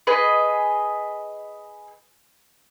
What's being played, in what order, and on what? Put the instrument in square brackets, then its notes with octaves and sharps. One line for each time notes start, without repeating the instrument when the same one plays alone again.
[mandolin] G#4 B4 D#5